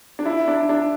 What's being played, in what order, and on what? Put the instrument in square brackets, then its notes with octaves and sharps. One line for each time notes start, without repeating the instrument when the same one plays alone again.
[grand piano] D4
E4
D4
D4